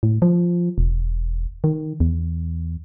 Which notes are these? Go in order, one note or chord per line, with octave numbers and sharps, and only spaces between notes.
A2
F3
E1
D#3
E2